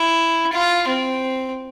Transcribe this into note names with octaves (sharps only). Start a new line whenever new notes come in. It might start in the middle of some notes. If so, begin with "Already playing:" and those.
Already playing: E4
F4
C4